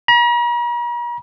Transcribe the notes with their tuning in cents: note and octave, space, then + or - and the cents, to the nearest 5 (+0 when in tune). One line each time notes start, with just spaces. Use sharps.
A#5 +45